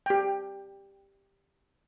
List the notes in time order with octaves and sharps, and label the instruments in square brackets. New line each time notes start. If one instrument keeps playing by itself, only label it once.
[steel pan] G4 G5